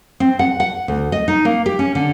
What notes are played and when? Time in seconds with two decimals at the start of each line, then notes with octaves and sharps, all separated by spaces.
0.20 C4
0.39 F#5
0.60 F#5
0.88 D2
1.12 D#5
1.28 D#4
1.45 A#3
1.66 G4
1.79 C#4
1.95 D3